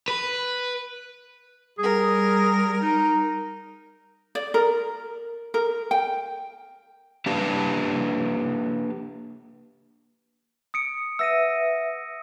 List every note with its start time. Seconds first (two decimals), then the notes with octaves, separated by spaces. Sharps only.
0.08 B4
1.79 G3 G#4 A#4
2.82 D#4
4.35 D5
4.54 A#4
5.54 A#4
5.91 G5
7.26 A#3 D4 G4 B4 F5 A5
10.74 D#6 C#7 D7
11.19 B4 E5 F#5 E6 A#6 D#7